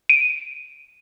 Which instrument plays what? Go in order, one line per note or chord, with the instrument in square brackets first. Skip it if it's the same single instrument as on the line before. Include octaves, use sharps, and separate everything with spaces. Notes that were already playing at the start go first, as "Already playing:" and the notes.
[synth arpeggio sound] D7 D#7